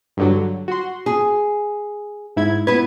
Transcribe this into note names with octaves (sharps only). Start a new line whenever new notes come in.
G2 D3 F#3
F#4 C6
G#4
G#2 E4 G#6
B3 E4 B4 G#6